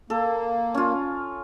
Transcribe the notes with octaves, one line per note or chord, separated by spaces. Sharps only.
A#3 A4
C#4 F4